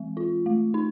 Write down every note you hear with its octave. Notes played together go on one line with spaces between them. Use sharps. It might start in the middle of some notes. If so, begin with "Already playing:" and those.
Already playing: E3 G#3 C4
F4
A3
D#4